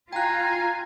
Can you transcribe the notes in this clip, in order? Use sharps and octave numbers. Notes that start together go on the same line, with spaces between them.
F4 G5 G#5 A#5 F#6